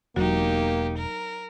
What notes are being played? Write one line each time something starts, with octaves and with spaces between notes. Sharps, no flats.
E1 F#3 A#3 D#4 F#4 G4
A#4